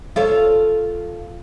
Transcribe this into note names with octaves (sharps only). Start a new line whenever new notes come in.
F4 A4 C#5